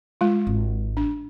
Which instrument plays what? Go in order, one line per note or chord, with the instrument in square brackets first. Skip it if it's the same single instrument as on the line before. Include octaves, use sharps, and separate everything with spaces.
[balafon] G#3 F4
[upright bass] G#1
[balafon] D4